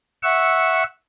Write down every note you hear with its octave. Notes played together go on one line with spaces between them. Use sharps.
E5 F#5 C#6 E6